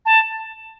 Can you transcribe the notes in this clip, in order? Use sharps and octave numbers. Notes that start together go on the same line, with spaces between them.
A5